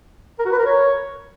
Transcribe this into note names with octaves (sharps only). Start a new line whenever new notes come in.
A#4
F#4
B4
A#4
C#5